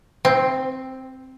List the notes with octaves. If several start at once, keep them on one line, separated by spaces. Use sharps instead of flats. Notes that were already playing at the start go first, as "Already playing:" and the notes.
C4